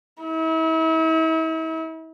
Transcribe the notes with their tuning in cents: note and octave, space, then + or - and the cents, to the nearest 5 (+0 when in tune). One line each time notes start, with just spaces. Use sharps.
E4 -40